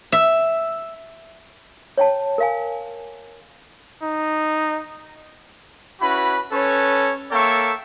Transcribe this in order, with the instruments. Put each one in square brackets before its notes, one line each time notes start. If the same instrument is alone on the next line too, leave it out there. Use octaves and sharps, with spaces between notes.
[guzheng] E5
[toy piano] C#5 G5 A5
A#4 F5 G#5
[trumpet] D#4
[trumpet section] C#4 E4 F#4 B4 B5
C#4 A4 B4 C#5
A#3 A4 C#5 E5 G5 C#6